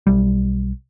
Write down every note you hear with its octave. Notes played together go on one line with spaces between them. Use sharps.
B1 G3